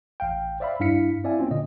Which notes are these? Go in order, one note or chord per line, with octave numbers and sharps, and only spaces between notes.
A1 F5 G5
C5 D5 E5 F5 B5
G2 D4 E4 F5 B6 C#7
C4 E4 D5 E5 F5 G#5
A#3 C4 C#4 F4
A#2 D3 D#5